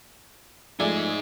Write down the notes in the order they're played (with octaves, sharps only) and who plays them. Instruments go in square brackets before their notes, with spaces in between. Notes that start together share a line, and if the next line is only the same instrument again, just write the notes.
[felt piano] F3 A3 [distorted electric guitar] D#4 G#5 [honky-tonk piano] G#4 D5 E5